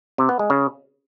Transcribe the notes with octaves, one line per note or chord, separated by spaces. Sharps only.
C3
B3
G#3
C#3